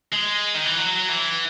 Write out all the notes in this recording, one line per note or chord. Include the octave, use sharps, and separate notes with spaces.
G#3
D#3
E3
F#3
E3